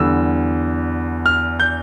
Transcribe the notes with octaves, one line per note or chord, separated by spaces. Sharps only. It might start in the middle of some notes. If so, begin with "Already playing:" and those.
Already playing: E2 D3 G3 E6
F6
G6